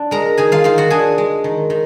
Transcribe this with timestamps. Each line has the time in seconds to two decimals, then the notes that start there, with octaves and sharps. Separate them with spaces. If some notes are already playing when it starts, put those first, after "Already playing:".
Already playing: D4
0.11 G#3 A#4 A#5
0.37 D#3 G#4 G#5
0.52 F4 F5
0.64 D#3 F4 F5
0.78 F#4 F#5
0.90 D4 G#4 G#5
1.18 G#3
1.44 D#3
1.70 D#3